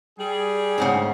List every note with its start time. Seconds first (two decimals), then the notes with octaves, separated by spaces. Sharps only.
0.19 G3 G#4
0.78 D2 G#2 C#3